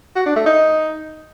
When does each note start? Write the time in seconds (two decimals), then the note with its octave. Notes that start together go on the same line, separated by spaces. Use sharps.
0.15 F#4
0.26 D4
0.36 A3
0.46 D#4